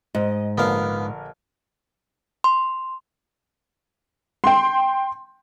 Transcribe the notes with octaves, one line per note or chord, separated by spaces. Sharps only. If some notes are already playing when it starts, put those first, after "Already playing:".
G#2 D#5
A#1 D3 B3 A#4 F5
C6
G5 C6